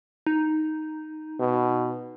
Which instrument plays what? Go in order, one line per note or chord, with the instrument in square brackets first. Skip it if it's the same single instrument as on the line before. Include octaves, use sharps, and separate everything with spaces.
[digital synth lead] D#4
[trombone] B2